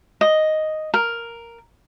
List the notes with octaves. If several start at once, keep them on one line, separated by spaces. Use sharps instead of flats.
D#5
A#4